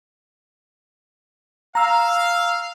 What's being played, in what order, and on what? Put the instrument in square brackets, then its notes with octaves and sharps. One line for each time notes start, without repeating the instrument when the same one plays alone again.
[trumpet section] F5 [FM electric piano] A#5 E6